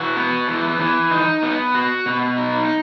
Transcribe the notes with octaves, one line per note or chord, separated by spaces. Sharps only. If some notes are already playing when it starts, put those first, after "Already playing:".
Already playing: E3 F#4
B3
E3
E3
D#4
B3
F#4
B2
D#4